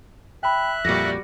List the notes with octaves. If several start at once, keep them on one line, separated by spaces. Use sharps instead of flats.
E5 G5 B5 F#6
F2 A#2 G3 F#4 D5 A#6